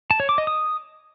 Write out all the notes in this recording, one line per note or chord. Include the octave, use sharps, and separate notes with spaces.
A5
C#5
D6
D#5
D#6